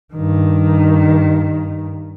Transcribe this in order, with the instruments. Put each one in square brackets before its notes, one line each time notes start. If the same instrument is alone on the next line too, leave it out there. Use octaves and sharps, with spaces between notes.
[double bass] G2 D#3